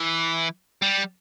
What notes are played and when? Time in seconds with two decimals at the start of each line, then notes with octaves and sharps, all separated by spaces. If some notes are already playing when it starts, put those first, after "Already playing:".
Already playing: E3
0.82 G3